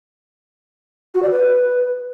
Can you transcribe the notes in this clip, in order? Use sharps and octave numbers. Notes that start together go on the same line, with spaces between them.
F#4
D5
B4